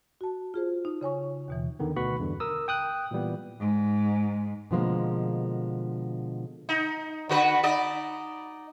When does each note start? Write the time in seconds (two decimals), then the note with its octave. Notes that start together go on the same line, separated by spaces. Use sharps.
0.21 F#4 A5
0.54 F4 G#4 C5
0.85 D#4
1.01 C#3 C#5 G#5 C#6
1.48 D#2 B2 E3
1.80 E2 D3 D#3 B3
1.96 D2 B2 F#4 B4 B5 C#6
2.19 E2 G2 D3
2.40 A#4 D#6 E6
2.68 G5 D#6 F#6
3.11 A#2 E3 G3 B3
3.58 G#2
4.71 B2 D3 F3 G3 G#3 A#3
6.69 D#4
7.29 D3 F#4 B4
7.63 D#4 D5 D#5